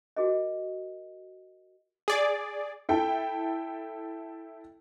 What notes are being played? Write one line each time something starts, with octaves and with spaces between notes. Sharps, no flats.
F#4 G#4 A#4 D#5
G#4 D5
E4 A4 G5